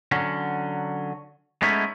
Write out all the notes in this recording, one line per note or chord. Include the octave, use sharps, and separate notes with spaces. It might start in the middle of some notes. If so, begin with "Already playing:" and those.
D3 F#3 C#4
G#3 A3 B3 C#4 D#4 E4